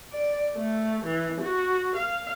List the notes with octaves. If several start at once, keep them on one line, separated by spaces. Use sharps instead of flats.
D5
A3
E3
F#4
F5